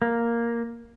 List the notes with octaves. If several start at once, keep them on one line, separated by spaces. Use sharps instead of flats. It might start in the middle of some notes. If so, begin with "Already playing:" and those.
A#3